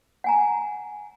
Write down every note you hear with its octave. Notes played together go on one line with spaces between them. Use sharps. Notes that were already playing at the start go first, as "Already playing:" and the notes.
F#5 G#5 A#5